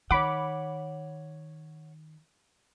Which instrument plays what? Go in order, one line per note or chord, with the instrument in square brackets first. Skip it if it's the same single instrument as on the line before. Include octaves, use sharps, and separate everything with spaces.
[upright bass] D#3 [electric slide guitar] C#5 F#5 [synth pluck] B5 D6